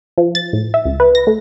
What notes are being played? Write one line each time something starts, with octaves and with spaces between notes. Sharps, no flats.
F3
A6
A2
E5
C#2
B4
A#6
A3